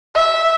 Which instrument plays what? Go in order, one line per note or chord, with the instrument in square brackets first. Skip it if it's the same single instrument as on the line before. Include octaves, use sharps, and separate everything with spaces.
[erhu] E5